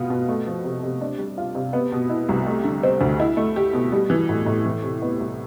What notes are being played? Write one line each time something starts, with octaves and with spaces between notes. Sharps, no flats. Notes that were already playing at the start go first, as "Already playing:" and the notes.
Already playing: B2 B3 F4
B2
A3
F3
C3
C3
D4
G3
F4
C3
B3
B2
E4
C2
A3
D3
C4
D2
E4
A3
G4
B2
G3
E3
A2
A2
E3
C3
B3
C2